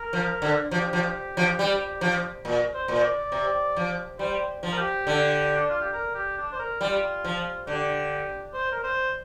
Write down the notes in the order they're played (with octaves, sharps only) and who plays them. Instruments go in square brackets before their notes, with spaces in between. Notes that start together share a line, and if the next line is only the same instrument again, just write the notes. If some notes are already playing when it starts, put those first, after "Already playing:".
Already playing: [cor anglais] A#4
[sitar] F3
D3
[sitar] F3 [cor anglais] G4
[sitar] F3
F3
G3
F3
A#2
[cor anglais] C5
[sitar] A#2
[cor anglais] D5
[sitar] C3
F3
[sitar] G3 [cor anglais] C5
[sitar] F3
[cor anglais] A#4
G4
[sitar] D3
[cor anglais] D4
F4
G4
A#4
G4
D4
C5
A#4
[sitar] G3 [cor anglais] F4
[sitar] F3
[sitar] D3 [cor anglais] G4
[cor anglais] C5
A#4
C5